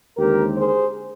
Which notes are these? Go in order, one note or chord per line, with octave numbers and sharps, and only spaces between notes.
D#2 D3 G#3 C4 G4 A#4
G#4 C5